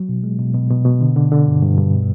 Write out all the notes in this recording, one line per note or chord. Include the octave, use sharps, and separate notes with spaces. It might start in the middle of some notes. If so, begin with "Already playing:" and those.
Already playing: F#3
B2
G#3
B2
B2
B2
B2
D3
D3
D3
G2
G2
G2
B2